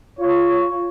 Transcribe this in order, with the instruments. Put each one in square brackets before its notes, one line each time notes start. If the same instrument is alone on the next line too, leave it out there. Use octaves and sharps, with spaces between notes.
[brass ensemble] F4 C#5